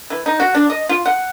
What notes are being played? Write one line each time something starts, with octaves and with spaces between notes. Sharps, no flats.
E3
D#4
F#4
D4
D#5
F4
F#5